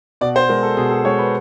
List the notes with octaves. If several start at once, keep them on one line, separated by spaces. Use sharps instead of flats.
B2 D5
C5
G#3 A#4
A4
B2 G#4
A4
G#3 C#5
B4